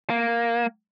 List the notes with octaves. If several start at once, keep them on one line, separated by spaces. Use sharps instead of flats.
A#3